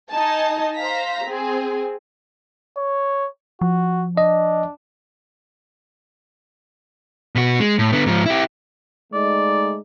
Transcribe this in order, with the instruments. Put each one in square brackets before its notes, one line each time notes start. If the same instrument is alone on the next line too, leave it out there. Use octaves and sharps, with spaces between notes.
[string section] D#4 D#5 G#5 A5
C5 F5 A#5 A#6 B6
C4 G#4
[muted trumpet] C#5
[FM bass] F3 [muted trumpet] F#4
[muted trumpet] D4 [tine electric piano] D#5
[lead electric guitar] B2 F#4
G#3
A2
D3 B3
G#2 F3
E4 G4
[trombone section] G#3 A3 D#4 [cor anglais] D5